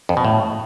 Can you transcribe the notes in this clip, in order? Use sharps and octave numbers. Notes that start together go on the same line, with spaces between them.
F2
B2
A2